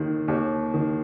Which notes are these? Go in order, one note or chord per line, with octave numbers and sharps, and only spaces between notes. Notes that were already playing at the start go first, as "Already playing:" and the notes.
Already playing: D#2 D#3
D#2
D#3